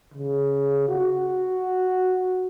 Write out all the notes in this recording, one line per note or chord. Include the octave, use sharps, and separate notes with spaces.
C#3
F#4